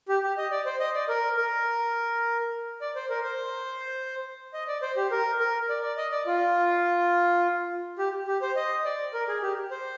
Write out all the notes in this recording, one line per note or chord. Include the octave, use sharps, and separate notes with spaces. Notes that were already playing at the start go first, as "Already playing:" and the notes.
G4
G4
D#5
D5
C5
D#5
D5
A#4
A#4
D5
C5
A#4
C5
D#5
D5
C5
G4
A#4
A#4
D5
D5
D#5
D5
F4
G4
G4
C5
D#5
D5
A#4
G#4
G4
C5